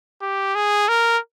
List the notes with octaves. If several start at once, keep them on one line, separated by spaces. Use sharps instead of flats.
G4
G#4
A#4